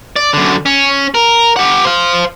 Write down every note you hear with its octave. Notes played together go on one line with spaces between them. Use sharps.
D5
F#2 D3
C#4
A#4
G4 F#5
C5 F5